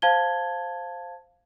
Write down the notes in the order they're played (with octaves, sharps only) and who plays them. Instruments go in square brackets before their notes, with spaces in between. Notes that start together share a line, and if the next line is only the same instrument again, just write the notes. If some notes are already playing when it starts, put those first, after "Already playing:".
[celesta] C5 F5 A5 G#6 G7